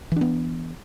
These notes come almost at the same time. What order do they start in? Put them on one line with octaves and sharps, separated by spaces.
E3 D4 B3